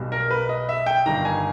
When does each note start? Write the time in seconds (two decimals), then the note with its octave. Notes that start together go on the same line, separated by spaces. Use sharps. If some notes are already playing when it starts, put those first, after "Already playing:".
Already playing: B1 B2 G3
0.12 A#4
0.31 B4
0.49 D#5
0.69 E5
0.86 G5
1.06 G1 G2 D#3 A#5
1.25 G#5